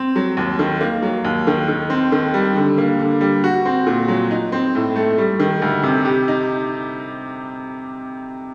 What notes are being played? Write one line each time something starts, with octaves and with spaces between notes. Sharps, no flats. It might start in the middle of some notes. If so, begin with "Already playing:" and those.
Already playing: C4
F#3
D#2
D#3
A#3
F#3
D#2
D#3
D#3
C4
D#3
G3
D3
A#3
D3
G3
F#4
C4
A#2
F#3
D#4
C4
A2
A3
G3
D#3
D2
C3
G4
D#4